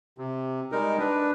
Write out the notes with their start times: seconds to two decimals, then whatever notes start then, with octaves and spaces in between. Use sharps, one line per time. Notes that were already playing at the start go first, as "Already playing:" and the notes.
0.18 C3
0.72 G3 G#3 D#4 A#4
0.99 D4 B4